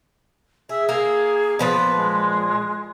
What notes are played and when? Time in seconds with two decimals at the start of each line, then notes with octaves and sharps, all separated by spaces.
0.69 G#4 E5
0.89 A#3 G#4
1.59 A#2 F3 B3 B4
1.97 G#3